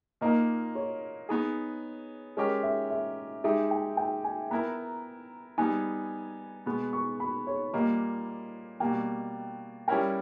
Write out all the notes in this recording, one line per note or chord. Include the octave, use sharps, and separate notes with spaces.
A#2 A#3 D#4 A#4 D#5
C#5
B3 D#4 G#4
G#3 C#4 G4 A#4 D#5
E5
E5
G#3 D#4 G4 E5
G5
G5
G#5
B3 E4 A#4 A#5
G3 B3 D#4 G#5
B2 G#3 B3 B5
C#6
B5
C#5
A#2 G3 A#3 D#5
B2 G3 A#3 G5
G3 C#4 E4 A#4 G5